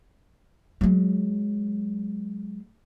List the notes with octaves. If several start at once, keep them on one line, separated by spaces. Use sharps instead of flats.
F#3 G#3